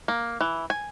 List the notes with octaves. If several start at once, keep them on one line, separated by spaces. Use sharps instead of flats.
A#3
E3
G#5